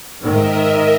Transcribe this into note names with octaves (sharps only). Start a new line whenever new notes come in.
G#2 D#3 A#4 D#5 E5